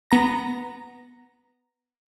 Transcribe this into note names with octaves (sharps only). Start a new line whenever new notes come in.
B3 A#5 A#6